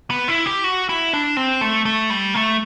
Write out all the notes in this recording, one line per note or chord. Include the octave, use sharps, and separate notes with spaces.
B3
E4
G4
F#4
E4
D4
C4
A3
A3
G3
A3